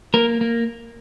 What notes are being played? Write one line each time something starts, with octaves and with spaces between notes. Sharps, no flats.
A#3 A#4
A#3